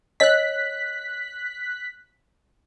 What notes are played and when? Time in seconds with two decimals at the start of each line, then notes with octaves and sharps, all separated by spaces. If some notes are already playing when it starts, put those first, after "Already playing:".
0.20 C#5 D#5 E6 F#6 B6